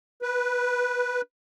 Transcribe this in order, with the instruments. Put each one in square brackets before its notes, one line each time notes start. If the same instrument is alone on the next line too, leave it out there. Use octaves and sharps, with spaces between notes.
[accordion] B4